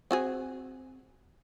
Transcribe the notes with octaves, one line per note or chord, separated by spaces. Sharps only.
C4 F#4 G#4